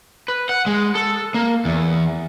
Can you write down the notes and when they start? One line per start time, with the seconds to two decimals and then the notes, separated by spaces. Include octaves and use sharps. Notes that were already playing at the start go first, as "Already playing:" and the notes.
0.28 B4
0.49 F#5
0.66 G#3
0.95 A4
1.34 A#3
1.65 E2